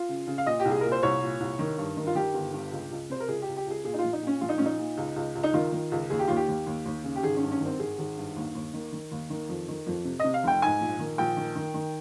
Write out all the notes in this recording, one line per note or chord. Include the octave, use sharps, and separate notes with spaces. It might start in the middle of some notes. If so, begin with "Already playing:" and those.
Already playing: F4
C#3
C#3
F5
A#2 D#5
G4
C2
G#4
A#2 A#4
C5
C2 C#5
A#2
C2
D#3
G2
D#3
F4
D#3 G4
G1
G2
C#2
C#2
C3 C5
A#4
C#2 G#4
G4
C#2
G4
C#2 G#4
A#2 G#4
D#4
F4
A#1
D#4
A#2 C#4
A#1 F4
D#4
A#1 C#4
D#4
A#2
C#2
C#2
C#2
D#4
D#3 F4
D#3
C#2
D#2 G#4
G4
D#2 F4
G4
D#2
D#2
D#2
C#3
G4
G#1 G#4
C#4
G2
C#4
D#3
C4
G#1 G#4
G#1
G2
D#2
D#2
D#3
D#3
D#2
D#3
F2
D#3
F2
C3
D#5
C3
F5
F1 G5
G#2 G#5
A#1
D#3
A#1 G5
D#3
D#3
D#3